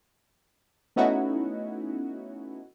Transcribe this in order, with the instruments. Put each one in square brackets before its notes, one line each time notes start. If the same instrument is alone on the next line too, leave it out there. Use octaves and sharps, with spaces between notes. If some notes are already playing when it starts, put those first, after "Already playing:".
[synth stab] A3 B3 C#4 D#4 E4 F#4